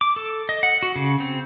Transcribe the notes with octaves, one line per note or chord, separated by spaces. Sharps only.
D6
A4
D#5
F#5
F#4
C#3
C4